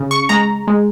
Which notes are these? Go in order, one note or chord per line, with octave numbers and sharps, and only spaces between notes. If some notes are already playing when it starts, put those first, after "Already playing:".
Already playing: C#3
C#6
G#3 A#5
G#3